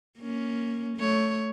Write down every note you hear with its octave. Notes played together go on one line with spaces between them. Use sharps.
A#3 C#4
A3 C#5